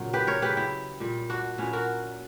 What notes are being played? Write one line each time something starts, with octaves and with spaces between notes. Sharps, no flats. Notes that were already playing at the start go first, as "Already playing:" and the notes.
Already playing: A#2 C#3 F#3
G4 B4
A#4 C#5
C#3 F#3 G4 B4
E4 G4
A#2 G3
D4 F#4
A#2 F#3 C#4 E4
F#4 A#4